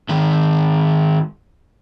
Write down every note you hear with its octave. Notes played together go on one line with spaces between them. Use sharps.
G#2 D#3